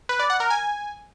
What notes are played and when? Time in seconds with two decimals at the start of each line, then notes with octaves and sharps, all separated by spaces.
0.09 B4
0.20 D5
0.30 F#5
0.40 A#4
0.50 G#5